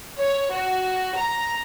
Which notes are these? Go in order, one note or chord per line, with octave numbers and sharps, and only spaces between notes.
C#5
F#4
A#5